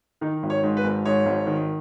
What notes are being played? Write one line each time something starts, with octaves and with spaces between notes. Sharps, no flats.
D#3 D#4
G#1
C#5
G#2
B4
G#1
G#2 C#5
G#1
D#3